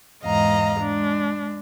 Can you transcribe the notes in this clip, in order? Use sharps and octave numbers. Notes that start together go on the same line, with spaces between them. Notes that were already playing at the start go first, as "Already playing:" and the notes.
E2 G#2 D#5 F5 A#5
G#3 D4